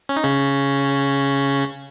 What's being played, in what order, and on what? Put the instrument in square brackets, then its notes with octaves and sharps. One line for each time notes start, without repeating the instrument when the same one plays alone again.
[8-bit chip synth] C#4
D#4
C#3 C#4